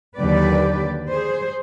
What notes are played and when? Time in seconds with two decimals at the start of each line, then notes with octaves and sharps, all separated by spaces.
0.17 D#2 D3 F#3 G4 B4 D5
1.10 G#4 C5